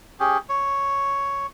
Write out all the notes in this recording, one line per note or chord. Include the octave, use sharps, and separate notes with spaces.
C#4 G4 G#4
C#5